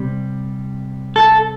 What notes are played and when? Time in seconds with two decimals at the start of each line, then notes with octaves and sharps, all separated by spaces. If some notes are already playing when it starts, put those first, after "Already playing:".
Already playing: C3 G3
1.16 A4